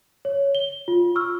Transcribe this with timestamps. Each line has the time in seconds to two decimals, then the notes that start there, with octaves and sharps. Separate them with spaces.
0.25 C#5
0.55 G7
0.88 F4
1.15 C#6 E6 F6